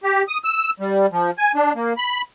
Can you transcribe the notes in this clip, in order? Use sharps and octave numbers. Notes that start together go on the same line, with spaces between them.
G4
D#6
E6
G3
F3
G#5
D4
A#3
B5